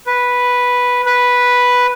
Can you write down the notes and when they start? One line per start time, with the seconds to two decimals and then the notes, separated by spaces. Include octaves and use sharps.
0.06 B4
1.06 B4